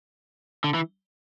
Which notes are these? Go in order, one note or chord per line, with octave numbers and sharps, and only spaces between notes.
D3
E3